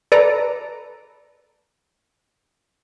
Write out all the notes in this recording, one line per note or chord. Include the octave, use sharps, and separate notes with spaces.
A4 B4 D5 A#5